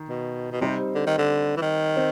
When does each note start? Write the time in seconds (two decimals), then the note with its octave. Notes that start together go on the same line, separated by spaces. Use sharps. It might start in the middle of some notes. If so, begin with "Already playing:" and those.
Already playing: D#3
0.09 B2
0.52 B2
0.61 C3 G3 C4 D#4 G4 C5
0.95 D3
1.07 D#3
1.18 D3
1.57 E3
1.62 D#3
1.96 C4